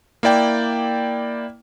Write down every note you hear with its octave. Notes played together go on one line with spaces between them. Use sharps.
A#3 E4 D5 G5